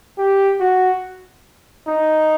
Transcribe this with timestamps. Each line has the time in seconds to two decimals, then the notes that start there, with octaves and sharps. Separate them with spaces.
0.18 G4
0.60 F#4
1.88 D#4